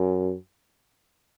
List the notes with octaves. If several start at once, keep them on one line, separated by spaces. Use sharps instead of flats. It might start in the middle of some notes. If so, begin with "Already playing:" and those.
Already playing: F#2